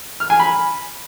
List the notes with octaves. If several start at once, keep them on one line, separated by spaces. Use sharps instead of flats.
F6
G#5
B5